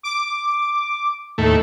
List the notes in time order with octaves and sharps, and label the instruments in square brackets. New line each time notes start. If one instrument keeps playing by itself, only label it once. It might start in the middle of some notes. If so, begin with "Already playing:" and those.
[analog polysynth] D6
[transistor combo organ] D#2 A2 A3